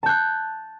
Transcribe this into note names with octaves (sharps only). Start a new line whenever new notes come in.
A5 F#6 G6